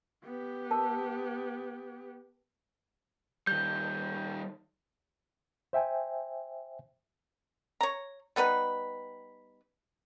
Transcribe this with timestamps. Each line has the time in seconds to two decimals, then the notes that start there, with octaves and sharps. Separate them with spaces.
0.24 B3 G4
0.71 A#4 A5
3.47 D#3 G3 G6
5.73 C5 E5 G5 G#5
7.81 C#5 A#5
8.36 G3 B3 D#4 B4